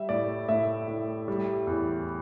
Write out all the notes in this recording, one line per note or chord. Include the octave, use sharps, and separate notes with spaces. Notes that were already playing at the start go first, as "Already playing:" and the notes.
Already playing: G3 E5
A2 D5
A2 E5
A2
G3
E2